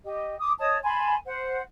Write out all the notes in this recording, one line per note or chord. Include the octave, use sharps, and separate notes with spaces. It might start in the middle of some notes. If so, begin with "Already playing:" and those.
G4 D#5
D6 D#6
C#5 D#5 A5 D#6
G#5 A5 B5 C6
C5 F#5